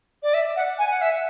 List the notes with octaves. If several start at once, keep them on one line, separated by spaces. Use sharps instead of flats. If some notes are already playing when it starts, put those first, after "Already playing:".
D5
E5
F#5
G#5
F#5
E5